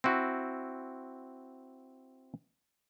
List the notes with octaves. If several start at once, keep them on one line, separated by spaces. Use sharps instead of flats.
C4 E4 F#4